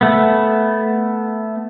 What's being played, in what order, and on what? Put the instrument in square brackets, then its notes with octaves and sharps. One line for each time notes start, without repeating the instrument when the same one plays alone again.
[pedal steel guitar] A3 B3